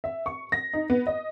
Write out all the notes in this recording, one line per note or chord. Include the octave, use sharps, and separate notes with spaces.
E5
C#6
A#6
D#4
B3
D#5